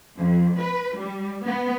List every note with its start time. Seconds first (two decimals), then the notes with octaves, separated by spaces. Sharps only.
0.18 F2
0.60 B4
0.99 G3
1.45 B3